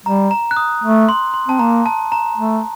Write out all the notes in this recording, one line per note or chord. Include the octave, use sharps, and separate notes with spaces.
G3 A#5
A#5
F#6
D#6
A3
C6
C6
C4 A5
A#3 A#5
A5
A#5
A3